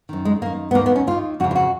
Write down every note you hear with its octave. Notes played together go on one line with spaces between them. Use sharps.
F#2 D#3
G#3
F#2 D#3 A#3
B3
D#2 D#3 A#3
B3
C#4
D#2 D#3 F4
F2 C#3 F#4
F4
F#4